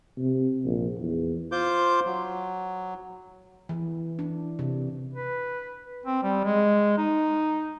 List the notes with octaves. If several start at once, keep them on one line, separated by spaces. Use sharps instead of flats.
C3
A#1
E2
F4 C5 D6 G6
F#3
E3
D4
C3
B4
C4
G3
G#3
D#4